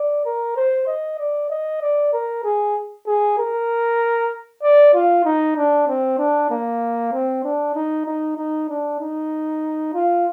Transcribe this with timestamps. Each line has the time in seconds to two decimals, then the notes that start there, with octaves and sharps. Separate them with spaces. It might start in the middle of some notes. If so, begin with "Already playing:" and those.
Already playing: D5
0.26 A#4
0.56 C5
0.87 D#5
1.19 D5
1.50 D#5
1.82 D5
2.13 A#4
2.44 G#4
3.07 G#4
3.38 A#4
4.63 D5
4.94 F4
5.25 D#4
5.57 D4
5.88 C4
6.18 D4
6.51 A#3
7.12 C4
7.44 D4
7.75 D#4
8.06 D#4
8.37 D#4
8.69 D4
9.00 D#4
9.94 F4